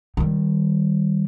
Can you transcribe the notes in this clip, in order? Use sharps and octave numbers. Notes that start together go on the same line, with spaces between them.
D#3 G3